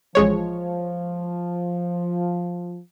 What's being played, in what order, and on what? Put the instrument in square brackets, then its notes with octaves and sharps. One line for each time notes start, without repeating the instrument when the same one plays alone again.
[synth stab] A1 G#3 C#5 [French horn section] F3